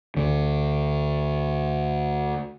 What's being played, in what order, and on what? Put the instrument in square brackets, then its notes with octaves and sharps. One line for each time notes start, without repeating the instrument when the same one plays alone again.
[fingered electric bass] D2 D3